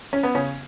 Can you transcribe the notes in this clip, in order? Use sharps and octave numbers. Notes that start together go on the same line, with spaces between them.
C#4
B3
C#3 C#4